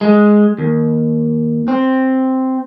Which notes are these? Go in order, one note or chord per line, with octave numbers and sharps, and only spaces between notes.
G#3
D#2
C4